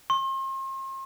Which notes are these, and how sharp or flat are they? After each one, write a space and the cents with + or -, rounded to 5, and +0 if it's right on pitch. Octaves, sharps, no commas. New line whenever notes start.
C6 +40